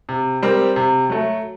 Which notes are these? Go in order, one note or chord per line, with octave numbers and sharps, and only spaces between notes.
C3
G3 C4 G4 A#4
C3
F#3 A3